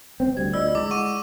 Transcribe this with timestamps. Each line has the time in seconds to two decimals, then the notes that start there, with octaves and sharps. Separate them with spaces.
0.20 C4
0.37 D2 G3 G#6
0.53 D2 F4 D5 D#5 E6
0.75 G#3 E4 D6
0.91 F#5 C#6 D#7